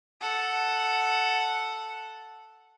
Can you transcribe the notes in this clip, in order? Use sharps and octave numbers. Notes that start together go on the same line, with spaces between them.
A4 F#5